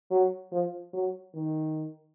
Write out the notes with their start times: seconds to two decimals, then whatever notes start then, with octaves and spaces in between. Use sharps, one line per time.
0.11 F#3
0.52 F3
0.93 F#3
1.34 D#3